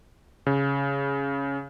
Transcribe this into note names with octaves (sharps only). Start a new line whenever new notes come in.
C#3